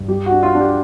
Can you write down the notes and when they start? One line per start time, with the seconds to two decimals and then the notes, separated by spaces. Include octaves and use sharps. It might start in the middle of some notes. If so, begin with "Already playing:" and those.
Already playing: G2
0.08 G3 G4
0.26 F#4
0.31 D4
0.43 F4
0.55 D4
0.61 G4